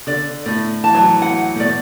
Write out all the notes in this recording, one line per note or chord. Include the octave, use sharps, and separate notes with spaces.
D3 D5
A2 D5
E3 A5
F#3
E3
E3 F#5
A2
B2 D5